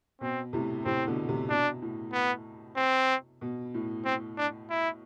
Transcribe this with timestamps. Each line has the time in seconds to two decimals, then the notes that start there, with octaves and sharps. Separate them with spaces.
0.21 B2 C4
0.53 A2 C3
0.85 A2 C3 C4
1.07 B2 D3
1.28 A2 C3
1.49 B2 D4
1.82 A2
2.13 B3
2.77 C4
3.41 B2
3.74 A2
4.05 C4
4.38 D4
4.70 E4